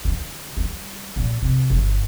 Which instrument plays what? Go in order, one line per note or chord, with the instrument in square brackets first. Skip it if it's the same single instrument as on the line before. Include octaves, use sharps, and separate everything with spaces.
[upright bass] D3
G3
A#2
C3
G1